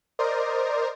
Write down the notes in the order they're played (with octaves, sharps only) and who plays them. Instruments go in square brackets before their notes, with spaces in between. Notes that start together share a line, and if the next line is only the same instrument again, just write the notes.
[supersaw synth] A#4 C5 D5 D#5